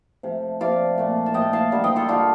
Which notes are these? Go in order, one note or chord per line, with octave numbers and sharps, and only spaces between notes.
C3 F3 A3
C3 F3 A3 D5 F5
A#2 A3
A5
A#2 A3 D#5 G5
F5 A5
D3 G3 A#3
D#5 G5
F4 A4
D3 G3 A#3 D4 F4